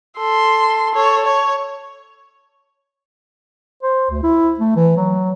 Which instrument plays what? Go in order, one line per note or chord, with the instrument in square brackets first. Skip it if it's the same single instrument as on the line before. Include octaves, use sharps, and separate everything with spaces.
[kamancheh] A4 C6
A4 C#5
C#5
[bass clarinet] C5
D2
E4
A3
E3
F#3